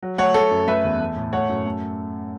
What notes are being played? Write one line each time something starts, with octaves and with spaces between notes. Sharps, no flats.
F#3
A3 C#5 F#5
A3 A4 C#5
F#2
A3 B4 E5
E2
A3
A2
A3 C#5 F#5
F#2
A3